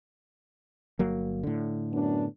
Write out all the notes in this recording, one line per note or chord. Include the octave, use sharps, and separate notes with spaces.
G1 F#3 A#3
A2 D3
F#2 B3 D4